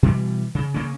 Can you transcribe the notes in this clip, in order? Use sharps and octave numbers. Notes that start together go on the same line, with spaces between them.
B2 E3 F#3 G3
C#3
C#3 A#3 C#4